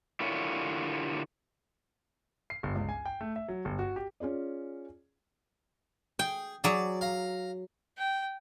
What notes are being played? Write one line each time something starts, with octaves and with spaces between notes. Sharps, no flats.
D3 E4 F4 G4 A#4 C#5
C7
G1
C#2
G#5
G5
A3
E5
F#3
G1
F#4
G4
C#4 F4 G#4 D5
G#4 G5
F#3 G#4 D5
F5 A#5
G5